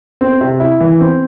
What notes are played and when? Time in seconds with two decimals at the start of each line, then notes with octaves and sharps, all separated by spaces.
0.21 C4
0.41 C3
0.60 E4
0.80 E3
1.00 C4